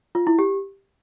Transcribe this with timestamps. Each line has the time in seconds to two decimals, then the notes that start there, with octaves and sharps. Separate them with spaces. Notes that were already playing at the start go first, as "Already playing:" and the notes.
0.15 F4
0.27 E4
0.39 G4